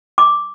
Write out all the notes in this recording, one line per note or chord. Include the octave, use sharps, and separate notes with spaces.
D6